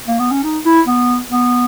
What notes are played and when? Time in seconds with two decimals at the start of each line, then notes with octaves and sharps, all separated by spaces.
0.07 A#3
0.19 B3
0.31 C#4
0.44 D#4
0.66 E4
0.87 B3
1.31 B3